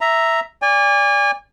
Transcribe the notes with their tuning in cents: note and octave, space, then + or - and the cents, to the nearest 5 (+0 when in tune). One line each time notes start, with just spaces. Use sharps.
E5 +0 A#5 +0
D5 -15 G#5 -35